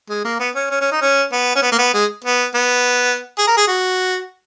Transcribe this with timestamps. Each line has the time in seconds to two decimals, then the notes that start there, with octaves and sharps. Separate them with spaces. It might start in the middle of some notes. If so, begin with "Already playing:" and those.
0.10 G#3
0.24 A#3
0.40 B3
0.55 C#4
0.71 C#4
0.81 C#4
0.91 D#4
1.01 C#4
1.32 B3
1.56 C#4
1.62 B3
1.72 A#3
1.78 B3
1.94 G#3
2.24 B3
2.55 B3
3.38 G#4
3.47 A#4
3.57 G#4
3.68 F#4